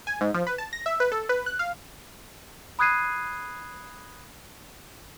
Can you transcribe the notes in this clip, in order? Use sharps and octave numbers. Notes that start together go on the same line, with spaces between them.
G#5
G#2
F3
B4
A5
A#6
E5
B4
A4
B4
F#6
F5
B5 D#6 F#6 G#6 C7 D#7